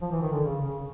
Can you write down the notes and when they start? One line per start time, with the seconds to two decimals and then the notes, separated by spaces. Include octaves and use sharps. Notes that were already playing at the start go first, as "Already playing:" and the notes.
0.02 F3
0.12 E3
0.22 D#3
0.32 D3
0.43 C#3
0.63 C#3